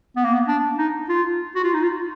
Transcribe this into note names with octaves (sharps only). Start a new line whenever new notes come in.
B3
A#3
B3
D4
D#4
F4
F#4
F4
D#4
F4